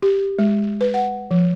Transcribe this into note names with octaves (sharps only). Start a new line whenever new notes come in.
G4
G#3
B4
F#5
F3